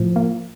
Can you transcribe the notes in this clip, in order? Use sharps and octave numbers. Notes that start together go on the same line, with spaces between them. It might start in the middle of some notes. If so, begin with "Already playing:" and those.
Already playing: A2 F3
A#3